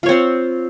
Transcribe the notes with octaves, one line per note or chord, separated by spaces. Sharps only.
C4 F4 C5 C#5